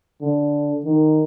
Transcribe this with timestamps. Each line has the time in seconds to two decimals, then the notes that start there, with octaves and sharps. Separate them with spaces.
0.21 D3
0.86 D#3